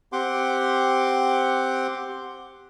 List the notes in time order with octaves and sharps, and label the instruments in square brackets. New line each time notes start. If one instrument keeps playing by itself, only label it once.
[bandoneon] C4 G4 F#5 C6 D6